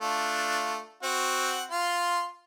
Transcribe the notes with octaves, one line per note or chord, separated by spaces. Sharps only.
A3 D4 F4
C4 F#4 F#5
F4 C6